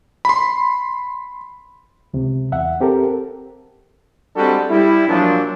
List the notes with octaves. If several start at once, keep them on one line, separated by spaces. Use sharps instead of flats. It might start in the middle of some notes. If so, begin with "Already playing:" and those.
B5 C6
C#2 C3
E2 E5 F#5
C4 G4 A4 A#4
G3 G#3 C4 D4 F#4 A4
G3 E4
A#2 F3 F#3 D4